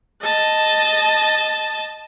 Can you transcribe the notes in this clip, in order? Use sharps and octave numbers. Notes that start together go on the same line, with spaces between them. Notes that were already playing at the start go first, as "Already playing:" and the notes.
D#5 A5